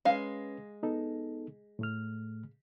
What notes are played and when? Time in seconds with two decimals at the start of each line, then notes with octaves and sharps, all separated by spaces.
0.05 G#3 C#4 B4 F5
0.83 B3 D#4 A4
1.79 A2 A3 F6